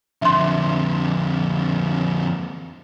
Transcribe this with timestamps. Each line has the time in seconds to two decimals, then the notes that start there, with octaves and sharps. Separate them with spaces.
0.22 F2 D3 E5 C6